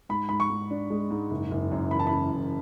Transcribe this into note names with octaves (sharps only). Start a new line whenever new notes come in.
G#2 B5
G#2 B5
C#6
G#2
D4
G#3
G#2
F#1
F#1
F#2
E3 B5
A5
C#3 B5
F#1